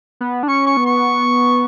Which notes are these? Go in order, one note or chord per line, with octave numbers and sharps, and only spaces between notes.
B3
D4
C#4 C#6
C#6
B3
C#6